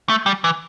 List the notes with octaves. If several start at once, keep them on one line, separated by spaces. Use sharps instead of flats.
A3
G3
E3